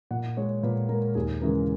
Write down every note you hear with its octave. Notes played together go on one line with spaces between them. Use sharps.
A#2 F#5
G#3 C#5
A#2 B4
G#3 A#4
D#2 G#4
C#3 E3 G#3 A#4